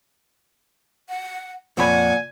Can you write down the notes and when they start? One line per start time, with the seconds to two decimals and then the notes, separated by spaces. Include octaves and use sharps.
1.09 F#5
1.77 F2 A#2 C#5 F#5 G#5 B5